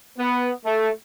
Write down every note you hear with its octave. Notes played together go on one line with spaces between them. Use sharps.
B3
A3